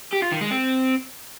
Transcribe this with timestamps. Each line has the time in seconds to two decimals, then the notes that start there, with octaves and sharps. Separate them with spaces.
0.13 G4
0.22 F4
0.32 D#3
0.41 G#3
0.50 C4